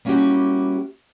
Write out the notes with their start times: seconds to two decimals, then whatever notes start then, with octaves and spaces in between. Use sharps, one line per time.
0.05 G3 A#3 C#4 E4 F#4 G4